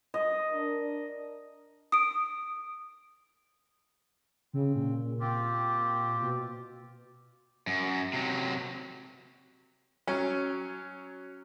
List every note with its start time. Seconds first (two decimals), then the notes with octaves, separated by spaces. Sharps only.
0.14 D#5
0.51 D4 A#4
1.92 D#6 D7
4.53 C#3 C4
4.75 A#2
5.20 C4 F4 G4
6.22 B2
7.67 F#2
8.13 C3 F#3
10.07 F#3 C#4